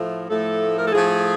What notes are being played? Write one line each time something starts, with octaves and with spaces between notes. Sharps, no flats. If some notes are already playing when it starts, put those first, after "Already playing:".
Already playing: A2 F3 A3
A2 F3 A3 A4
A#4
A4
A2 F3 A3 G#4